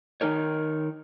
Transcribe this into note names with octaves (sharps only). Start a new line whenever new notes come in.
D#3 D#4 A#4 C#5